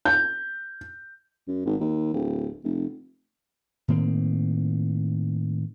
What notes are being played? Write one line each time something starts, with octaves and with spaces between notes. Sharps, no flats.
G6
F#2
G#1
D#2
D1
F1
A2 D#3 A#3 C4